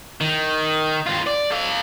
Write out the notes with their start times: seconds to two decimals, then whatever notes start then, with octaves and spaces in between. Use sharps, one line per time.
0.21 D#3
1.06 G2 F4
1.26 D5
1.51 A4 F5